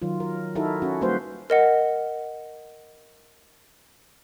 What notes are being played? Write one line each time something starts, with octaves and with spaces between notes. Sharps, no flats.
D#3 F#3 F4
A#4
D#4 E4 F#4 A4 A#4
C#4 F#4
G3 A#3 F#4 B4 C5
A#4 D#5 F#5